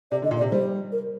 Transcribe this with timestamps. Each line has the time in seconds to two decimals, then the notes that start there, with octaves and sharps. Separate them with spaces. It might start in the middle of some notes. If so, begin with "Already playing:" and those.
0.11 C3 D5
0.22 D3 D#5
0.31 A#2
0.38 D5
0.41 C3
0.51 G3 C5
0.92 A#4